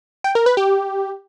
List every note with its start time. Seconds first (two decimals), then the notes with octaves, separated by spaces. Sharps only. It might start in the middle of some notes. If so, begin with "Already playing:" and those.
0.24 G5
0.35 A#4
0.46 B4
0.57 G4